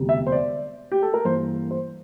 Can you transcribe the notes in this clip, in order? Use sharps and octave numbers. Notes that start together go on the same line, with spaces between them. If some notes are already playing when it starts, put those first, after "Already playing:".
Already playing: E1 D2 C3 G3
E5
C5
D5
G4
A4
A#4
G2 E3 A#3 C5
C5